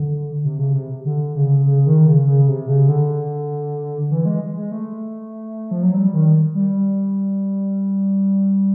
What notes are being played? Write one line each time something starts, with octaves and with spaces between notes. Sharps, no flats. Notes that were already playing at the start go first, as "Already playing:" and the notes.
Already playing: D3
C3
C#3
C3
D3
C#3
C#3
D#3
C#3
C#3
C3
C#3
D3
E3
G#3
G#3
A3
F3
F#3
G3
D#3
G3